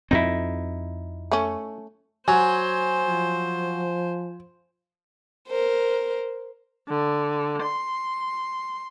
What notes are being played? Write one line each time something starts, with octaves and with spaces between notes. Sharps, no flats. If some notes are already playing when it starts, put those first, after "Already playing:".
F2 C4 D#4 E4
A3 C#4
F#3 C5 G#5
F3
A#4 C5
D3
C6